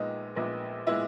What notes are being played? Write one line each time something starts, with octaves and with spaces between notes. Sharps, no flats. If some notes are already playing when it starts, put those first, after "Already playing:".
Already playing: A#1 A#2 G#3 B3 D#4
A#1 A#2 G#3 B3
A#2 G#3 B3 E4